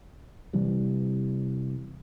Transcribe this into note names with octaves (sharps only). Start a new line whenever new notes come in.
C3 E3 G3